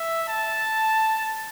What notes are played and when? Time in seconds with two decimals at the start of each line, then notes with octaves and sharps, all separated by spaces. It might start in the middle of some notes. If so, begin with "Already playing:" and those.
Already playing: E5
0.28 A5